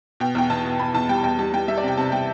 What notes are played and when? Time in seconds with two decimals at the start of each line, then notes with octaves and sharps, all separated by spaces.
0.20 B2 G5
0.35 E2 G5
0.50 E2 A5
0.65 B2
0.79 B2 B5
0.94 E2 A5
1.09 G3 G5
1.23 E2 G5
1.39 G3 A5
1.53 G3 G5
1.68 G3 E5
1.78 D5
1.83 C3 G5
1.97 C3 A5
2.12 G3 G5